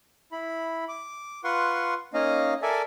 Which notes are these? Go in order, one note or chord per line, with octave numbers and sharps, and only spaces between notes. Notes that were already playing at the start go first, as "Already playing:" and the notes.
E4 B5
D6
F4 B4 F#5 C6 C#6
A#3 C#4 D#4 D#5 F5
A4 A#4 D5 E5 G#5